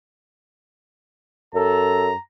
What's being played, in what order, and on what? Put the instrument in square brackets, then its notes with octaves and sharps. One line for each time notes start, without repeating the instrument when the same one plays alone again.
[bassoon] F#2 [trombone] A4 [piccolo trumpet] A#5